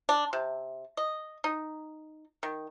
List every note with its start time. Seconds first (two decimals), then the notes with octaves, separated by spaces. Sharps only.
0.09 D4
0.33 C3
0.97 D#5
1.44 D#4
2.43 D#3